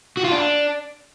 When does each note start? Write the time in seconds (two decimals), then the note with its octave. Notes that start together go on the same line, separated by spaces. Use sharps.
0.17 F#4
0.24 F4
0.32 D4